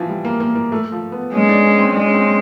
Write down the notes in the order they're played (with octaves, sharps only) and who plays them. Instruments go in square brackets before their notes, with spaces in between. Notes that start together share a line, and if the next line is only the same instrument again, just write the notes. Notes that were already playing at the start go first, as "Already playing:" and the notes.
Already playing: [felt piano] E3 F3
G3
A#3
A#3
A#3
A3
F3
B3
[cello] G#3 [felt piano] C#4
[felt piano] D4
C#4
C4
[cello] G#3 [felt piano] D4
[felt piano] C#4
C4
C#4